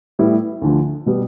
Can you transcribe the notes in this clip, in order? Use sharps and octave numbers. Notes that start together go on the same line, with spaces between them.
A2 G3 B3 E4
D2 D3 F3
B2 G3 B3